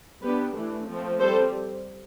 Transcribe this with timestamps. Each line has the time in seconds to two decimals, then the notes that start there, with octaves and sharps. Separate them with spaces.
0.22 G3 B3 D4 G4 B4
0.55 E3 A3 D4
0.87 F3 A3 C4
1.19 G3 C4 A4 C5